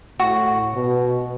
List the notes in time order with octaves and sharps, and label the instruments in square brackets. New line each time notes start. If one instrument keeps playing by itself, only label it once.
[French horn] A2 [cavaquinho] F#4
[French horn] B2